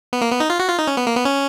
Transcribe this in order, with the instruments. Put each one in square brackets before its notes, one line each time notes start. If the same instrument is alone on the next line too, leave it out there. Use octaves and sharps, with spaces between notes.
[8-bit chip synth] B3
A#3
B3
D#4
F4
F#4
F4
D#4
C#4
B3
A#3
B3
C#4